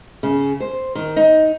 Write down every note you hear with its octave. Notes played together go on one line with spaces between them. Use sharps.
C#3
C5
D#3
D#4